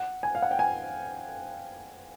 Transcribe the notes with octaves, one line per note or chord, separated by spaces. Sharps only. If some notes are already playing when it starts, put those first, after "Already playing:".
Already playing: F#5
G#5
F5
F#5
G5
G#5